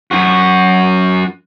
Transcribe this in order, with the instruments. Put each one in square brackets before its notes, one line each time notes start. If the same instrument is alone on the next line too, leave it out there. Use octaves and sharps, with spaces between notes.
[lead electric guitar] F#2 F#4